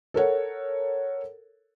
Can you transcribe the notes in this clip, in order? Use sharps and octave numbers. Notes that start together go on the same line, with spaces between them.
A4 A#4 C#5 F#5